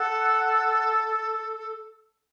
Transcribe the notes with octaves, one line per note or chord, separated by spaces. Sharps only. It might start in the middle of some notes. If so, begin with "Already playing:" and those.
Already playing: A4 F#5